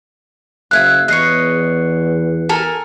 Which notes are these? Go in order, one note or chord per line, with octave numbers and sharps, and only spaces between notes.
F#1 E5 F5 F#6 G#6
E2 C#5 D#5 F#6 C7 C#7
A4 A#4 G#5